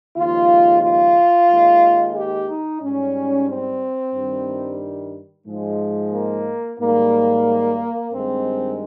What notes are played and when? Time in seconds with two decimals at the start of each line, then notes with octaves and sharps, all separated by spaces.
0.16 D#2 C#3 F3 G#3 F4
0.82 F4
1.50 D#2 D#3 G#3
2.15 G4
2.49 D#4
2.82 G#2 G3 C#4
3.48 C4
4.14 G2 D#3 G3
5.46 G#2 F3 G#3
6.13 A#3
6.79 G#2 D#3 G3 A#3
8.11 G2 D#3 G#3 C4